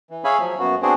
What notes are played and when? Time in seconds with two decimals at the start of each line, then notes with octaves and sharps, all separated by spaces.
0.10 E3
0.24 G#4 C#5 E5 F5 G#5 B5
0.40 F3 F#3
0.59 F#2 A#3 B3 F#4
0.82 B3 C4 D4 F#4 G#4 C5